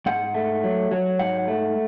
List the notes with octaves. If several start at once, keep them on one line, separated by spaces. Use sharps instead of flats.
G#2 F#5
A3
F#3
F#3
G#2 F#5
A3